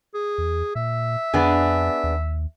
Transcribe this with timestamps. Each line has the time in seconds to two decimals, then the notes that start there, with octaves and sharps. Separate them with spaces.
0.14 G#4
0.38 E2
0.75 A#2 E5
1.34 F2 B3 D4 G#4
2.04 D#2